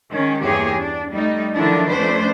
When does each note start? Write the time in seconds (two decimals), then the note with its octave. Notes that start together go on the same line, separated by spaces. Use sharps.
0.11 D#3 G#3 C#4
0.43 E2 G2 A#3 G4 G#4 C#5
0.77 D4
1.12 G3 A3 D#4
1.55 D3 D#3 F3 F#3 D4 E4
1.92 F2 A3 C#4 D4 B4 C5